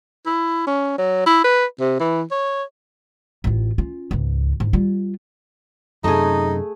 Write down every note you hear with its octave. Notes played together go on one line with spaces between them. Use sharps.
E4
C#4
F#3
E4
B4
C3
E3
C#5
A1 F4
C#4 F4
C#2 G#2
G#2
G3 F4
F#2 C3 A3 D#4 G#4